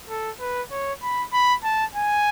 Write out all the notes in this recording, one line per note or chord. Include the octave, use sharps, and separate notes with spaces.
A4
B4
C#5
B5
B5
A5
G#5